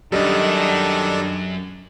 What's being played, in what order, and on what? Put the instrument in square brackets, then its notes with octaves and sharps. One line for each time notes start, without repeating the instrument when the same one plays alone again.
[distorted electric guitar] F#2 [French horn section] D#3 [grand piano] G3 D#5 [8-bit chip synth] D4 A4